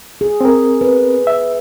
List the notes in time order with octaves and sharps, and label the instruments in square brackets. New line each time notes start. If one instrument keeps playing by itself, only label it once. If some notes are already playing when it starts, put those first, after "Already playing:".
[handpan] G#4
[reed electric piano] C4 A#4
[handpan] B4
[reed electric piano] E5